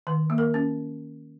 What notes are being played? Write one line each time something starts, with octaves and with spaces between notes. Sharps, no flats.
D#3 B4
A#3
A#4
C#4